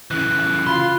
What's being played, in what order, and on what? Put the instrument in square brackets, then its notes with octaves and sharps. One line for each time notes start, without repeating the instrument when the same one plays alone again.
[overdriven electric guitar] C#3 E3 [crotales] F#6
[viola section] F4 [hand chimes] B5 [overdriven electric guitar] C6